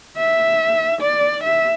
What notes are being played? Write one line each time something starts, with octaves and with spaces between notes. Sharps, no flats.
E5
D5
E5